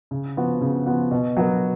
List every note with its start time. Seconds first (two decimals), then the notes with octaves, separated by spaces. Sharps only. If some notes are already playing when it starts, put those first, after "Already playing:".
0.11 C#3
0.37 F3 B3 F#4
0.61 C#3
0.86 F3 B3 F#4
1.11 B2
1.37 F#3 B3 F#4 A#4